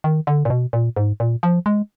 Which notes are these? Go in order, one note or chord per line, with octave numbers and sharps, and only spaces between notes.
D#3
D3
A#2
B2
A#2
G#2
A#2
F3
G#3